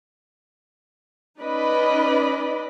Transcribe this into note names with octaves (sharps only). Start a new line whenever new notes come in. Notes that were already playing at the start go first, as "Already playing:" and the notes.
C#4 D#4 B4 D5 D#5 B5